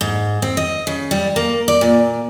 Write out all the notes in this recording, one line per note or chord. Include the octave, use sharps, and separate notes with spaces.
G#2
C4
D#5
C#3
G3
A#3
D5
A#2